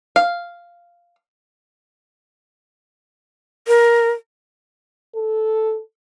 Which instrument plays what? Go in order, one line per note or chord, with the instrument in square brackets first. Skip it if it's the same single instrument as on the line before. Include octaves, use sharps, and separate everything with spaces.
[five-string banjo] F5
[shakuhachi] A#4
[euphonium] A4